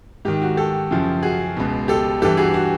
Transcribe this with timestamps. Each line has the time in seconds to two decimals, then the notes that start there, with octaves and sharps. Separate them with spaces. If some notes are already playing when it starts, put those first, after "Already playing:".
0.25 G#2 D#3 G4
0.42 F#4
0.57 G4 A4
0.91 F#2 C#3 F3
1.23 F#4 G#4
1.56 C#2 B2
1.88 G4 A4
2.21 G2 E3 G4 A4
2.37 F#4 G#4
2.54 F#4